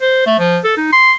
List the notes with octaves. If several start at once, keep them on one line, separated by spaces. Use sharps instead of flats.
C5
A3
F3
A4
D#4
C6